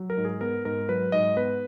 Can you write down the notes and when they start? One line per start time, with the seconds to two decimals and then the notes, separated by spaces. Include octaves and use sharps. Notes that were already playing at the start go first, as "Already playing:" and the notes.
Already playing: F#3
0.10 A#4
0.17 G#2
0.25 G#4
0.41 B3 A#4
0.65 G#2 A#4
0.89 F#3 B4
1.12 G#2 D#5
1.37 B3 B4